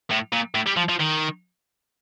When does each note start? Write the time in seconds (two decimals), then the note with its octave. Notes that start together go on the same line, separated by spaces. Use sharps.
0.11 A2
0.33 A#2
0.55 A2
0.67 G3
0.77 F3
0.89 F3
1.00 D#3